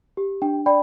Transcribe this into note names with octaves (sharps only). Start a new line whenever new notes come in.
G4
D4 G5
D5 G5 B5